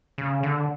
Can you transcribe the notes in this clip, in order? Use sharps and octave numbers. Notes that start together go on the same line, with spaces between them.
C#3
D3